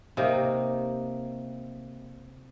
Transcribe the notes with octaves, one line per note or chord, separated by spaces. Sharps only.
C3 A#3 D#4